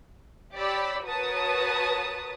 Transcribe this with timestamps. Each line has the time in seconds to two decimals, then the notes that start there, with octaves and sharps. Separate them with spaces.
0.54 G4 C#5 D5 B5 E6
1.06 F#4 A#4 B4 C#5 A5 D#6